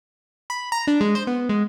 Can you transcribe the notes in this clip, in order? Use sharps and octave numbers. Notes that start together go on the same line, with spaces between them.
B5
A#5
D4
G#3
C5
B3
G#3